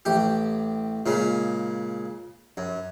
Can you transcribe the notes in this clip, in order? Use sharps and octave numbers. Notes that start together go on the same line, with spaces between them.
A1 G4
A#2 C#3 G#3
F#2